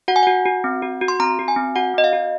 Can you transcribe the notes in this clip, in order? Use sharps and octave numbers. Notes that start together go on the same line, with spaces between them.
F#4 F#5
G#5
F#4 F#5
F#4
C4
F#4
F#4
C6
C4 A#5
F#4
G#5
C4
F#4 F#5
C4 D#5
F5
F#4